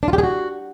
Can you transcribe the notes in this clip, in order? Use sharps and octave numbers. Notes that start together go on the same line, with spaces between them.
D4
F4
G4
G#4
F#4